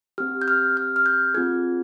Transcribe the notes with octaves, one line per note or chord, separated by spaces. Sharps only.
C4 G4 F6
G6
F6
F6
F6
G6
C4 F4 G#4 G#6